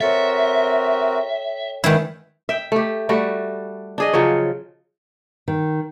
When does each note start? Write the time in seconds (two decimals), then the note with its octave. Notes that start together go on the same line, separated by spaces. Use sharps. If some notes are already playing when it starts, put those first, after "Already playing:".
0.01 C4 F#4 A4 A#4 C#5 E5 G5
1.84 D#3 G#3 E4 B4 F#5
2.49 E5 G5
2.72 A3 G4
3.09 G3 A3 F#4
3.98 D4 G#4 D#5
4.13 C#3 F3 F#3 C#5
5.48 D#3